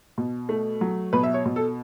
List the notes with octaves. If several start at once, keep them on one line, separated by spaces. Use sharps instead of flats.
B2
A3
F#3
B2 B4
E5
C#5
B2
A4